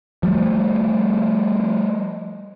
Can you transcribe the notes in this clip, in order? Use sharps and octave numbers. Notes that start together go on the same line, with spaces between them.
F3 G3 A3